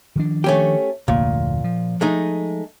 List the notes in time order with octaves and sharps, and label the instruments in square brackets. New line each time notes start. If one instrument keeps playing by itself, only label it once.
[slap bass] D#3 F3 D4
[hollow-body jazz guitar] A3 C#4 G4
[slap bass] F1 D2 [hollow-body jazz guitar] A#2
[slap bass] F3
[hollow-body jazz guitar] G#3 A3 D#4